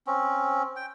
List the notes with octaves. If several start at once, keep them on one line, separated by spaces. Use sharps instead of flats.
C4 C#4
G5